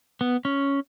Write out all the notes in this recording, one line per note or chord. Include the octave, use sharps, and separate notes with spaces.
B3
C#4